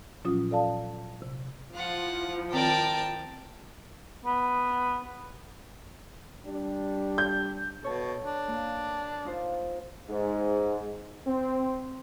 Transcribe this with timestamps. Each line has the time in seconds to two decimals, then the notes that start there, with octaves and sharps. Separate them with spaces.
0.25 A#2 F3 F#3 C#4 F4 D#6
0.51 A4 D5 F5 A5
1.22 C3
1.74 F3 E4 F4 F#5
2.53 D#3 C4 A#4 D5 G5 A5
4.25 B3
6.45 G3 D4
7.18 G6
7.83 B2 A4 C#5 A5
8.23 D4
8.48 A#3
9.25 D#4 F4 C5
10.09 G#2
11.27 C4